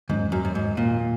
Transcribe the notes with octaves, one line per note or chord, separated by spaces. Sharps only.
E2 G#2 D#3 F#3 C#4
F#2
F#2
G#2
A#2